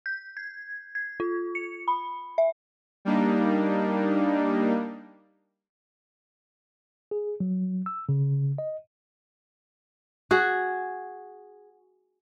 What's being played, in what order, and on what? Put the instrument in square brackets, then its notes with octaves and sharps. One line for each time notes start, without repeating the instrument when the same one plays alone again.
[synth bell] G6
G#6
G#6
F4
C#7
B5
E5
[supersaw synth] G3 A#3 D4 D#4
[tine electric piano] G#4
F#3
E6
C#3
D#5
[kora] F#4 G#4